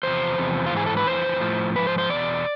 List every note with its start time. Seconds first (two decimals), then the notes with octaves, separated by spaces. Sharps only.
0.03 E2 C3 F3 C5
0.38 E2 C3 F3
0.66 F4
0.72 G#2 E3 G#4
0.86 A4
0.97 B4
1.07 F2 E3 C5
1.41 A2 F3
1.76 G#2 F3 B4
1.87 C5
1.98 C5
2.10 E2 B2 D5